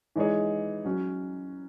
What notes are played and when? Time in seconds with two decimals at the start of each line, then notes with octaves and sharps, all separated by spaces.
0.16 E3 G#3 D#4 G#4 C#5
0.85 F#3 C#4 F#4